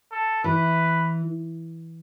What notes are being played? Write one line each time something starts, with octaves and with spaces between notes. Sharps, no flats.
A4
E3 B4